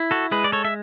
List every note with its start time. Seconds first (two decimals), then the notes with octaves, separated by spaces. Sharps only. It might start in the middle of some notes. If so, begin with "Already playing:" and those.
Already playing: E4
0.11 F#4 A4
0.31 G#3 G#4 B4
0.44 D5
0.52 A4 C#5
0.65 E5